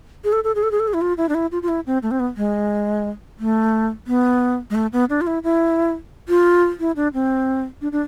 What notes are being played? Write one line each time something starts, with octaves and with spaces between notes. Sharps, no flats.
G#4
A4
A4
G#4
A4
G#4
A4
G#4
E4
F4
E4
D4
E4
F4
F4
E4
C4
A3
C4
B3
G#3
A3
B3
G#3
A3
B3
D4
F4
E4
E4
F4
E4
D4
C4
D4
D4